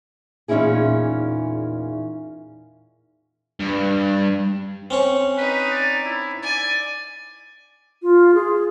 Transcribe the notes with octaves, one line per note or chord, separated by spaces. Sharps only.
E2 A#2 C#4 D#4 E4 G#4
G2
C4 C#4 C#5
D#4 B4
D5
E4
D5 G#5
F4
G#4